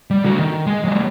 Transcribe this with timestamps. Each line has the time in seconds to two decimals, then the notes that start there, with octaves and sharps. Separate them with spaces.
0.11 G3
0.25 D3 F#4
0.39 D#3
0.67 G#3
0.85 F#3 G#3